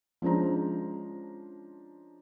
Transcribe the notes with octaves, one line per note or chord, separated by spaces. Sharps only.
F3 G#3 C#4 D4 C5 A#5